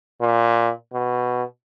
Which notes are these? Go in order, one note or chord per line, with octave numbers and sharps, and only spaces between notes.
A#2
B2